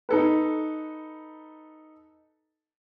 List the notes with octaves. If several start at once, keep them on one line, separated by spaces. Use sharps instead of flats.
D#4 A4 B4